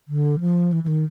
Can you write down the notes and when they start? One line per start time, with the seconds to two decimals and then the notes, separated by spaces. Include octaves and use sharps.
0.08 D3
0.40 F3
0.72 E3
0.84 E3
0.88 D#3